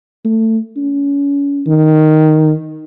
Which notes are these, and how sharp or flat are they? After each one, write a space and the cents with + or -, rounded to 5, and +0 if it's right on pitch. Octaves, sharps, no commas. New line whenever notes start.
A3 +20
C#4 +30
D#3 +0